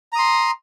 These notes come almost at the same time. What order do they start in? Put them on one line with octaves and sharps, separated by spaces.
A#5 D#6 C6